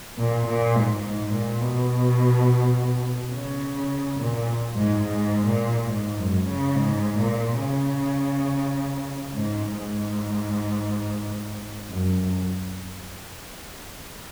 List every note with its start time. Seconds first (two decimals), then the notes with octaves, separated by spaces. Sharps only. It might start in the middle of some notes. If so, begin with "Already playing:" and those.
0.18 A#2
0.47 A#2
0.75 G#2
1.04 G#2
1.34 A#2
1.61 B2
3.33 C#3
4.19 A#2
4.76 G#2
5.04 G#2
5.47 A#2
5.90 G#2
6.18 F#2
6.48 C#3
6.76 G#2
7.19 A#2
7.62 C#3
9.34 G#2
9.76 G#2
11.90 F#2